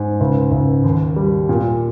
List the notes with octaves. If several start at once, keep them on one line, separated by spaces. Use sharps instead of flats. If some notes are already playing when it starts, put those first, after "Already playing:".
Already playing: G#2
C#2
C#2
D#2
G3
A#2